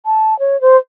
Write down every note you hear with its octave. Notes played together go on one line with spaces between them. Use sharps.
A5
C#5
C5